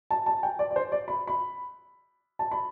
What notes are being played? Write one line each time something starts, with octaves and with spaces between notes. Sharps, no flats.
A5
A5
G5
D5
D5
C5
D5
B5
B5
A5
B5